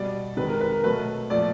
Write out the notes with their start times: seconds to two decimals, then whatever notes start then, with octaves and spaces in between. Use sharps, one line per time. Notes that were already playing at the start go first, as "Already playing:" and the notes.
Already playing: B2 G3 D5
0.37 C3 D#3 G#3 B4
0.49 A#4
0.61 B4
0.72 A#4
0.84 B2 F#3 A3 B4
1.30 A#2 F3 A3 D5